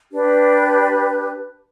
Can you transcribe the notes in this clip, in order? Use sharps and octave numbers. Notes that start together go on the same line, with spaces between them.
D4 G4 B4